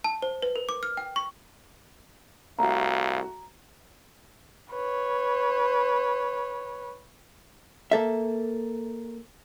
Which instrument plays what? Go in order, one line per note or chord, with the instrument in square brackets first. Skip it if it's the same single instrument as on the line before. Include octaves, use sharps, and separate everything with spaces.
[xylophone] A5
C5
B4
A#4
D6
F6
G5
C#6
[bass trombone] C2 [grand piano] A3 F#4 [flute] F5 [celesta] A#5
[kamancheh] B4 C#5
[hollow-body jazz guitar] A#3 A4 E5